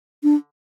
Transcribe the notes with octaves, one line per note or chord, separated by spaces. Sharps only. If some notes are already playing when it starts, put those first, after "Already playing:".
D4